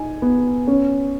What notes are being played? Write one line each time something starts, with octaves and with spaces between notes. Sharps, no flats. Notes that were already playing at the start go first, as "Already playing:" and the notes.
Already playing: D#4 G#5
B3
C#4